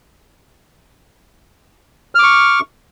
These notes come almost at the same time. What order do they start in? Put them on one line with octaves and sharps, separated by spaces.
F6 D6 C#6